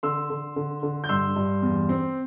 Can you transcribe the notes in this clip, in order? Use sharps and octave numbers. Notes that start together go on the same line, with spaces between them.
D3 C6 E6
D3
D3
D3
G6
G2 C6 E6
G2
E2
C4